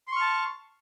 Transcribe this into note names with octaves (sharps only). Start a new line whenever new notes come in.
A5 C6 C#6 F6